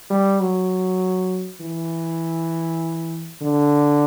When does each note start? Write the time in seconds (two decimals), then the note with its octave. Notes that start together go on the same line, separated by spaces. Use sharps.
0.11 G3
0.40 F#3
1.61 E3
3.42 D3